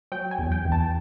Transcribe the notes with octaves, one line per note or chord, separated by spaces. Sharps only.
F#3 G5
G#5
E2
G5
E2
A5